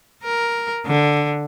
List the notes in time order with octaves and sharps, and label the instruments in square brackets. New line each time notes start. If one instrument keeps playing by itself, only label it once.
[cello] A#4
D3